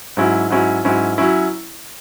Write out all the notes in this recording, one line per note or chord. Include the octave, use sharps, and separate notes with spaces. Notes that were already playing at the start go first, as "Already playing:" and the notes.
G#2 F#3 C#4 E4
G#2 F#3 C#4 E4
G#2 F#3 C#4 E4
F#3 C#4 E4